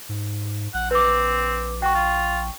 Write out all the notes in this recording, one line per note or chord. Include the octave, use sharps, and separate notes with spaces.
G#2
A#1 F#5
C4 B4 D6
F#4 G5 C#6
F4